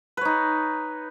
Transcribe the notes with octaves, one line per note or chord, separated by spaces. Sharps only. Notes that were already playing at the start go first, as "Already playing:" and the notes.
D#4 B4 C#5